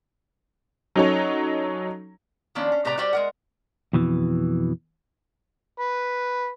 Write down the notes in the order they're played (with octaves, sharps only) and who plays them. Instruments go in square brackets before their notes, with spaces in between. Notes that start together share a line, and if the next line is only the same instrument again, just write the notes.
[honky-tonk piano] F#3 C#4 D#4 F#4 A4 C#5
[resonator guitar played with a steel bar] D#3 F3 A#3 C#4 D4
C#4
A2 C3 G4 B4 D5 A#5
G3 F#4 G4 C5 D5 G5
G#3 A#4 F#5
[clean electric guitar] F2 B2 E3
[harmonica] B4